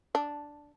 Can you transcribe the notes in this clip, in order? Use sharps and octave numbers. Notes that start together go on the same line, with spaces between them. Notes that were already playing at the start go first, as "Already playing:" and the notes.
D4